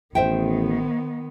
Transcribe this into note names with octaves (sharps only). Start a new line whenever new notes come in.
A1 D#3 B3 C5 E5 G5